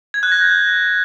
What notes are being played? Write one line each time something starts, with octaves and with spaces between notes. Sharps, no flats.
G#6
F#6
A#6
G6